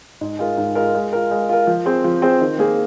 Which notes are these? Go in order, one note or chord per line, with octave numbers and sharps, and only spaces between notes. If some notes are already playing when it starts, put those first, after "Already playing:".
G#2
G#3 F4 A#4
G#2
G#3 F4 A#4
G#3
F4 A#4
G#3
F4 A#4
F3
C4 G#4 C5
F3
C4 G#4 C5
D#3
A#3 G#4